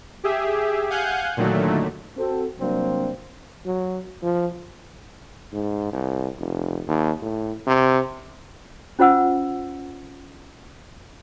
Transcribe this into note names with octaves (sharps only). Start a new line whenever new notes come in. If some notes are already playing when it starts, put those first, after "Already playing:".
G4 G#4 E5
F5 F#5 G#5 F#6 G6
A#2 D3 D#3 F#3 A3
C4 F#4 A4
C3 F#3 G3 A#3 C4 D4
F#3
F3
G#2
C2
F1
D#2
A2
C3
C#4 F4 C5 F#5 E6